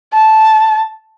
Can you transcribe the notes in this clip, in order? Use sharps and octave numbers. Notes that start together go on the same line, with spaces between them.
A5